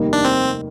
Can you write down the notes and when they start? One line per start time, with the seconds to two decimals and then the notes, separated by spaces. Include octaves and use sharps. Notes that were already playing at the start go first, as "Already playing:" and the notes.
Already playing: F1 D#2 D#3 G3 A#3
0.13 D4
0.25 C4